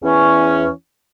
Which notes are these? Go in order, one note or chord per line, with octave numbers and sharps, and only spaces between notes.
E2 E3 C#4